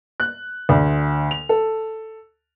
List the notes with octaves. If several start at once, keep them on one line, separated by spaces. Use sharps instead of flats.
F#6
D2
F7
A4